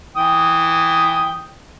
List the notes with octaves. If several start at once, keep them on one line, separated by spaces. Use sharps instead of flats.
E3 G5 D#6